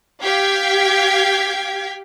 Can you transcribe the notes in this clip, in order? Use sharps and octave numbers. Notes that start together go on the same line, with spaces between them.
G4 F5 G5 G#6 B6